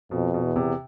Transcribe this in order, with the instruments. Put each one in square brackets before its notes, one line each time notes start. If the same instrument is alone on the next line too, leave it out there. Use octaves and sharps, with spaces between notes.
[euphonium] F2 [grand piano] B2
[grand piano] B2
[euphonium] E2
[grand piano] C3